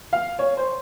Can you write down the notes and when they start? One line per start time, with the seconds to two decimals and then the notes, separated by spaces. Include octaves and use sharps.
0.13 F5
0.39 C#5
0.57 C5